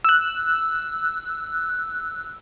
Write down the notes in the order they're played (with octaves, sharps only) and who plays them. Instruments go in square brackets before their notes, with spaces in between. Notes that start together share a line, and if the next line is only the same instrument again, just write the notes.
[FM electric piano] E6 F#6